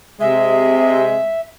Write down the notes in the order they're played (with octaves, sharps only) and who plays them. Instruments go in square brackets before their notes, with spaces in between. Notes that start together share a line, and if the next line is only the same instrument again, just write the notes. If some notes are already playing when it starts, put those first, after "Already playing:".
[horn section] C3 G#3 [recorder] E5